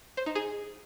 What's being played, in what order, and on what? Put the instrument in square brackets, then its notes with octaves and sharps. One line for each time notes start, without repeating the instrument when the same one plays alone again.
[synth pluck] C5
D#4
G#4